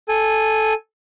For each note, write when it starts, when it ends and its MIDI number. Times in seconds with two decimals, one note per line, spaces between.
0.09 0.73 69
0.09 0.73 80